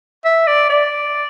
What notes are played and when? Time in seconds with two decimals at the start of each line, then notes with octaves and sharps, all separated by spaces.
0.25 E5
0.47 D5
0.70 D5